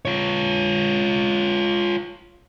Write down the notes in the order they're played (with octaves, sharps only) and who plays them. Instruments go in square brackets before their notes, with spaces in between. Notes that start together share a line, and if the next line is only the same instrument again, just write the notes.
[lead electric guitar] F4 C#5